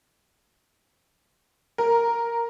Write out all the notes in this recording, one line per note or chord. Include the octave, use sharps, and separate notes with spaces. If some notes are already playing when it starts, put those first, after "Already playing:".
A#4